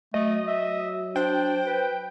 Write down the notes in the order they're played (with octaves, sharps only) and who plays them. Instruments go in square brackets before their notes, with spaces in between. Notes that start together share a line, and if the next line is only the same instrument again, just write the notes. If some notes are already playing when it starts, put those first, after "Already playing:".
[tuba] F#3 [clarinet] A3 [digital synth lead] D#5
[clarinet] E5
[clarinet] D4 [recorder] C5 [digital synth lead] G5
[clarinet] B4